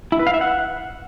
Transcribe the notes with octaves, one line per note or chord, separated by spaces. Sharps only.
E4
B4
F5
E5
F#5